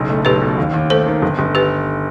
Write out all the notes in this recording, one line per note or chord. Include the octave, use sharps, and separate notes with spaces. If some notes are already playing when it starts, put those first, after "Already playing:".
Already playing: F#1 B1
A3
B1 G4 B4
B2
D#2
D#2
A3 A4 C5
D#3
G1
G1
G4 B4